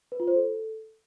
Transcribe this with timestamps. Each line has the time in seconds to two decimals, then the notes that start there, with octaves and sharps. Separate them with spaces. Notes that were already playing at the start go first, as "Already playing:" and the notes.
0.12 B4
0.20 F4
0.28 C5
0.35 A4